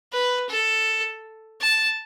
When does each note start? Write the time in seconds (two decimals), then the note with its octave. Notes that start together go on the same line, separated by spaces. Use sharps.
0.12 B4
0.49 A4
1.61 A5